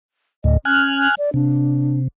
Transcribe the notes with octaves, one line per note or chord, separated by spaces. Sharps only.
D2 A2 D#5
C#4 G#5 F6 F#6
D5
C3 D4